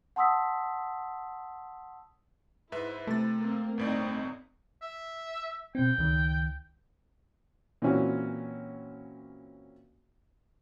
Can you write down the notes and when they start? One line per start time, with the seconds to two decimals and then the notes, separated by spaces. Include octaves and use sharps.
0.16 F#5 A5 C6 D#6 E6 B6
2.72 G#2 E4 B4 C5 E5
3.07 C3 A3 A6
3.39 A#3 C4
3.78 G1 A2 C4 D#4 D5
4.82 E5
5.75 B2 C4 G5
5.98 C#2 D#3
7.82 A#2 E3 C4 C#4 F#4